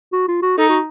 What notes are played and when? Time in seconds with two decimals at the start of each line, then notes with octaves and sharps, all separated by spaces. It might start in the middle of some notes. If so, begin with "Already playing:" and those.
0.12 F#4
0.28 F4
0.42 F#4
0.58 D#4 A4
0.69 F#4